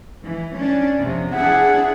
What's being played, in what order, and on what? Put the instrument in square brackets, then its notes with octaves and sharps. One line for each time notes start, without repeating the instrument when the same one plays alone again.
[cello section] E3
C#4 D4
E2 C3 F3
[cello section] D4 E4 G#4 [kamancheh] F#5